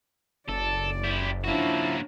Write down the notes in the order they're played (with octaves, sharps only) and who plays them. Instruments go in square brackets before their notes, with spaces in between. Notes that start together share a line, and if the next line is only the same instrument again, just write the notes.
[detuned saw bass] F#1 [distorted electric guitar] A4 [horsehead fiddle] D5
[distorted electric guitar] E4 G4
[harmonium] F3 E4 [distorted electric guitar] A#3 F#4 [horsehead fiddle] C#4 D4